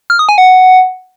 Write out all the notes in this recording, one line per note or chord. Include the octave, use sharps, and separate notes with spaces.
F6
D#6
G#5
F#5